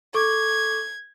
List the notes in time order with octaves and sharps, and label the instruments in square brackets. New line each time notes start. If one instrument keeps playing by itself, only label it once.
[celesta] A4 C#6 D6 [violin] G#6